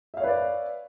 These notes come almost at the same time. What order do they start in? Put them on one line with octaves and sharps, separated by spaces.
E5 F5 C#5 B4 D5